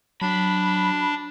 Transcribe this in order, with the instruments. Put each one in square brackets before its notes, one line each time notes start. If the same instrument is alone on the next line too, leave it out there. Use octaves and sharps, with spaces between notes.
[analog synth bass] F#3 [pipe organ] D4 [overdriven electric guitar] B5